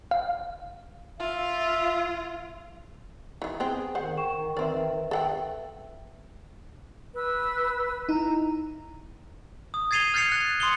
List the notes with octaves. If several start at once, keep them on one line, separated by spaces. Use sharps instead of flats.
F5
F4 E5
D#3 E3
B3 C4 G#4
D#3 C5 F#5
G5 C#6 E7
C4 B4 D5 E5
A4 F#5 G5
B4 E6
D#4 E4 A#5
D#6
G#6 A6 C7 D#7 F7 G7
F6 G6 A6 C7 C#7 F7
F#6
C6 D#6 C#7 F7 G7